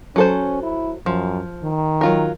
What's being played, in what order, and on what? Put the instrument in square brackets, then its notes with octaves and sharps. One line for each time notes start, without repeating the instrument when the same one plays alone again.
[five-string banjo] F#3 A4 C5 [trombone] C#4
[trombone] E4
[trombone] F#2 [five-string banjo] F3
[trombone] D#3
[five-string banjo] F#3 F4 A#4